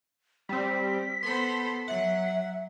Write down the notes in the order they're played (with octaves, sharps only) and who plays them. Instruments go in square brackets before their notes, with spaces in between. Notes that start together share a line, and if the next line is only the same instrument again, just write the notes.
[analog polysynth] G3 C4 [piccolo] B6
[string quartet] B3 A4 C5 [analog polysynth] B5 C6
[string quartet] F#3 [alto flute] E5 [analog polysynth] F#5